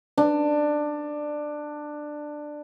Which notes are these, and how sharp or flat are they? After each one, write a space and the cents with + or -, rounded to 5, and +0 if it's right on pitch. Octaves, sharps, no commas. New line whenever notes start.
D4 +15